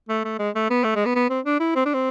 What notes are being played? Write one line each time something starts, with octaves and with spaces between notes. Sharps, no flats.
A3
A3
G#3
A3
B3
A3
G#3
B3
B3
C4
D4
E4
C4
D4
C4